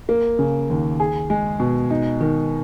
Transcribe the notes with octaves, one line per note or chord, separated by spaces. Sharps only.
A#3
C#3
D#2
G#4
G#3
B2
D#4
D#3